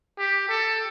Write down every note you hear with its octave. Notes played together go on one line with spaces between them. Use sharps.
G4
A4